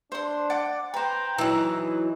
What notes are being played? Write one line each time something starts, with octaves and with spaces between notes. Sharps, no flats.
D4 C5 C6
D5 F#5 D6
B4 C5 G5 A#5
E3 F#3 D#4